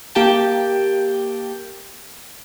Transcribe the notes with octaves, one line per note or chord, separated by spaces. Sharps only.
A#3 G4 G5 A5